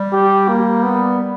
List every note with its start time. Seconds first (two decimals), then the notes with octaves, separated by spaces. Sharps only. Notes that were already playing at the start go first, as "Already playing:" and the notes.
Already playing: G3
0.13 G4
0.48 A#3
0.83 B3